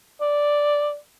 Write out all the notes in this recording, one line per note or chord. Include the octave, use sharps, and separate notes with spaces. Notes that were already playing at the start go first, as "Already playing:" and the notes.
D5